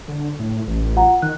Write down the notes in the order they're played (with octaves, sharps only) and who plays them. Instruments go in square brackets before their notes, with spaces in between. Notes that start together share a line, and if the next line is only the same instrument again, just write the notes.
[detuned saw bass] D3
A2
A1
[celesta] F4 F#5 A#5
[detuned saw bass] D#3 [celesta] F#6